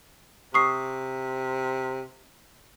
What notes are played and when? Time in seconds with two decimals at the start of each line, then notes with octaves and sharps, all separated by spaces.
0.54 C3 C#6 D#6 C7